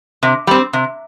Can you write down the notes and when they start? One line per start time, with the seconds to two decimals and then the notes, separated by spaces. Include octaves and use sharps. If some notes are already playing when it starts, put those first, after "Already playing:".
0.23 C3
0.47 G3 C4
0.73 C3